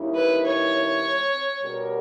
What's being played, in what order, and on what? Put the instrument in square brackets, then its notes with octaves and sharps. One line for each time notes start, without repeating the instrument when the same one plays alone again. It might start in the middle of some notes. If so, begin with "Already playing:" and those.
Already playing: [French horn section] D#2 D#3 G3 C#4 E4
[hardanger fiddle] B4
C#5
[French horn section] B2 G3 C#4 G4 A#4